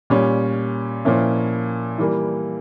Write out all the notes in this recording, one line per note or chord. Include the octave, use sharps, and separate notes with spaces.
A#2 G3 C#4
A#2 F3 A#3 C#4 E4
E3 G3 A#3